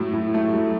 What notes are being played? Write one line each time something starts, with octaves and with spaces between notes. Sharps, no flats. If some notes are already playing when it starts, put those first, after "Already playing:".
Already playing: A2 F#3 A3 E4
A2
A3
F#3